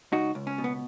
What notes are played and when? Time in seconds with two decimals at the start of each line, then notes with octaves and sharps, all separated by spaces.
0.12 C#2 D#4 F#4
0.35 C#2
0.47 C#4
0.58 B2
0.64 B3